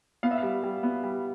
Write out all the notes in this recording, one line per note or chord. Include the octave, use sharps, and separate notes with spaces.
B3 F5
E5
G3 F5
G3
B3
G3